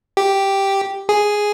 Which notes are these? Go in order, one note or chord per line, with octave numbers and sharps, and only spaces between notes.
G4
G#4